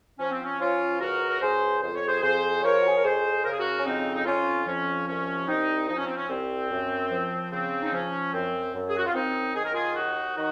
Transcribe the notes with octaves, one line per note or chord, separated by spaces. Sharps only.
F3 C#4
C4
C#4
F3 C#4 F4
C#2 F#4 A#4
A#4
C#2 G#4 C5
F2 C5
C#5
G#4 C5
F2 G#4 C5
F3 A#4 C#5
F4
F#4
G#4
A#4
F2 G#4 C5
C#3 A#4
G#4
F#4 A#4
C#4
F2 C4 D#4
D#4
F2 C#4 F4
F3 C#4
C2 C#4
C2 C4 D#4
F3 D#4
C#4
C4
C#4
C2 C4
F#2
F3
C#3 C4
D#4
F3 C#4
F#2 C4
F#2
G#4
F#4
F4
F#2 C4 D#4
D#3 G#4
A#4
F4 G#4
D#2 D#4 F#4
D#3 D#4 F#4